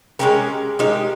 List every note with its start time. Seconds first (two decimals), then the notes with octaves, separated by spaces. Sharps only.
0.19 G#3 C#4 G4 A#4
0.79 G#3 D#4 G4 A#4